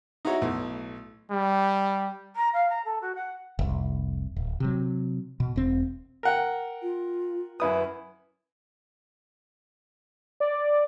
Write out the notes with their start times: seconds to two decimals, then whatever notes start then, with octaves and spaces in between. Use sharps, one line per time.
0.25 D#4 E4 F#4 C#5
0.42 B1 A2
1.31 G3
2.36 A#5
2.53 F5
2.70 A#5
2.85 A4
3.02 F#4
3.15 F#5
3.59 F1 C2
4.36 D1
4.60 C3 F#3
5.40 B2
5.56 E1 C4
6.23 A#4 F#5 G5
6.82 F4
7.60 F#2 E4 B4 D#6
10.40 D5